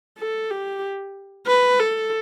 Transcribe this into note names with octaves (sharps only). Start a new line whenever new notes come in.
A4
G4
B4
A4